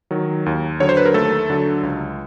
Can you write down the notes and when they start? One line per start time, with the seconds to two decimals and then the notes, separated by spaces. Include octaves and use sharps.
0.11 D#3 F#3
0.46 D#2
0.80 D3 F#3 C#5
0.89 C5
0.97 B4
1.06 A#4
1.14 D#2 A3 A4
1.50 D3 F#3
1.83 C#2